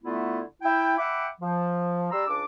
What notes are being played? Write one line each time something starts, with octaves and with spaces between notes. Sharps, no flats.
D3 A3 B3 E4 F4
E4 G5
E5 F#5 G5 B5 D6
F3
G3 D5 A#5 C6 E6
C#2 D4 D6